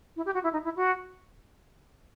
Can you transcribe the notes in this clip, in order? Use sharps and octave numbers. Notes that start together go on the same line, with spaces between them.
E4
G4
F#4
E4
D#4
E4
F#4